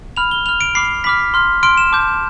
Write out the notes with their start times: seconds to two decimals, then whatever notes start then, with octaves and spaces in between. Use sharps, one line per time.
0.17 B5 F6 F7
0.31 G7
0.46 B5 F6 F7
0.61 D7
0.75 B5 D6 F6 C7
1.04 B5 D6 F6 B6
1.34 C6 F6
1.63 C6 F6 D7
1.77 E7
1.92 A5 D6 G6